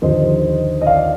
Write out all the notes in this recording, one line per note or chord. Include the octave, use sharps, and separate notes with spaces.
D#2 D3 F3 C5 D#5
D#5
D5 F5